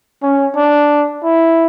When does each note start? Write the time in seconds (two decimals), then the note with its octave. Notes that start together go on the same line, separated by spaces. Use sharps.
0.22 C#4
0.56 D4
1.23 E4